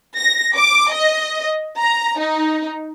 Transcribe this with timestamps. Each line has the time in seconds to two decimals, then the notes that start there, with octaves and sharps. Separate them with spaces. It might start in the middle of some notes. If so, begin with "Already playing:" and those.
0.17 A#6
0.56 D6
0.92 D#5
1.77 A#5
2.18 D#4